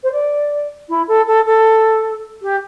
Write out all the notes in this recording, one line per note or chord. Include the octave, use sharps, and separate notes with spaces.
C5
D5
E4
A4
A4
A4
G4